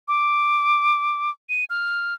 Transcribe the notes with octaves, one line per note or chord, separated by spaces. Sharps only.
D6
D#7
F6